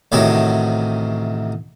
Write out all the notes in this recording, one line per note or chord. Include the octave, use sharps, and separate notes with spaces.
A1 A2 C3 D#3 F#4 C#5